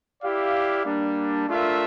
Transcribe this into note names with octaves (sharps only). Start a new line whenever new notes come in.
E4 G4 D5 F5
G3 A#3 D4
A3 D4 F4 A#4 E5